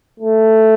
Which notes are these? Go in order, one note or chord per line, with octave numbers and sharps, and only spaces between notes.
A3